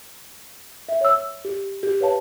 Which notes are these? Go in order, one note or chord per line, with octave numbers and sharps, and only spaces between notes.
E5
C#5 E6
G4
G4
B4 C#5 F5 A5